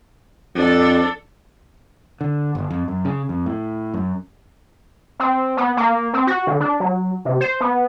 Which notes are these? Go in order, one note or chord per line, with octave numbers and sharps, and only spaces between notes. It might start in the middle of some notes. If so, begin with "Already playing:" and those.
F2 D4 A4
D3
G1
F2
F#2
C#3
F2
A2
F#2
C4
B3
A#3
C4
F#4
D3
D4
F#3
C3
C5
B3